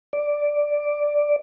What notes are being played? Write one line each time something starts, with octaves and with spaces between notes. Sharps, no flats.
D5